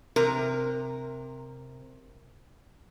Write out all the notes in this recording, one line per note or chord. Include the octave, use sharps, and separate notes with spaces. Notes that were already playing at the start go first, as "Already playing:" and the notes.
C3 A#4